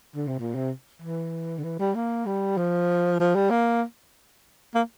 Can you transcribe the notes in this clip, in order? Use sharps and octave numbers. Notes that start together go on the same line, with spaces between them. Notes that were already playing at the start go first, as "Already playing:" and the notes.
D3
C3
A#2
C3
E3
D3
E3
G3
A#3
G3
F3
F3
G3
A#3
A#3